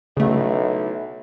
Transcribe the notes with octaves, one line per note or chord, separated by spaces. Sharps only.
B1 C#3 A3 E4